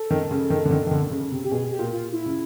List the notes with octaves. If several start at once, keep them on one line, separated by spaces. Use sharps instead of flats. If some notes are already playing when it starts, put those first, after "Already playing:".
Already playing: A4
D#3
C#3
D#3
D3
D#3
D#3
D3
C#3
C3
G4
B2 G#4
G4
A#2
F4
E4
C#3